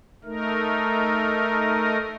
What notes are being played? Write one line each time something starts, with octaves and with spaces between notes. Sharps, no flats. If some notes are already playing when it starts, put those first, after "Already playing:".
A3 D#4 A#4